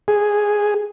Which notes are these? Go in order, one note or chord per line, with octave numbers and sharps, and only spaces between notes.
G#4